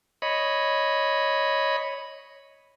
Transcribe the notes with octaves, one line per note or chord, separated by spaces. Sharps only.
C#5 D#5 B5